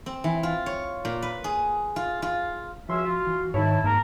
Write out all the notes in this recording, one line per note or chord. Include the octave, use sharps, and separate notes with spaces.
C4
E3
F4
C#5
A#2
B4
G#4
F4
F4
C#2 F3 C#4 F#4 E5 C6
F4
E3
G#2 D#3 E4 C#5 A5
G#2 A#3 A#4 A5